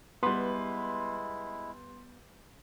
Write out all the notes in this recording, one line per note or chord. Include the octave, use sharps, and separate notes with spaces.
G3 G#3 B3 E4 B4 C6